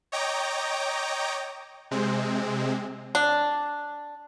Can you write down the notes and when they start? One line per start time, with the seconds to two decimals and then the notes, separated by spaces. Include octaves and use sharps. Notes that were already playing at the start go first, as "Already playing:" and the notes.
0.12 C#5 D#5 G5 A#5 D6
1.91 C3 G#3 C4
3.15 D4